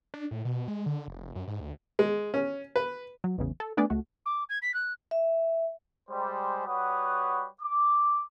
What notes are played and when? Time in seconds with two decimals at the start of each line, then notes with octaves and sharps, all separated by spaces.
0.14 D4
0.31 A2
0.45 B2
0.68 G#3
0.86 D3
1.08 F1
1.35 F#2
1.48 G#2
1.60 D2
1.99 G#3
2.34 C#4
2.76 B4
3.24 F#3
3.38 A1 E2 C#3
3.60 A4
3.77 A3 B3 D4 G#4 B4 D5
3.90 C#2 A3 F#4
4.26 D6
4.49 G#6
4.62 B6
4.74 F#6
5.11 E5
6.10 G3 G#3 C5
6.66 G3 F#4 B4 C#5 F#5 D#6
7.61 D6